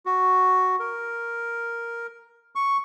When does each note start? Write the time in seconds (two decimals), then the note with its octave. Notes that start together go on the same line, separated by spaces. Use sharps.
0.06 F#4
0.80 A#4
2.55 C#6